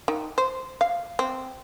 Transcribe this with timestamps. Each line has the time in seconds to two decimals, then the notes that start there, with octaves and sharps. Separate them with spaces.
0.08 D#3
0.38 C5
0.81 F5
1.19 C4